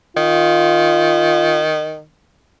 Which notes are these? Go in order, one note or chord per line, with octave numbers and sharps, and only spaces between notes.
D#3 F4